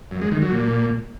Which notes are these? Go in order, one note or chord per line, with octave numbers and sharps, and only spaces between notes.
F#2
G#3
D#3
F#3
A#2